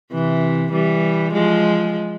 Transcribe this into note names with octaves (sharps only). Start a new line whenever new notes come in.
C3 E3
E3 G3
F3 G#3